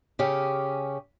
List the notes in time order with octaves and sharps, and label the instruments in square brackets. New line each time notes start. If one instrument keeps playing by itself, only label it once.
[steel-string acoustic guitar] C#3 C#4 G4